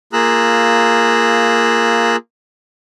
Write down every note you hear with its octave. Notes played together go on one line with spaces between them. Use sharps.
A#3 F4 G#4 A#5 E6 F#6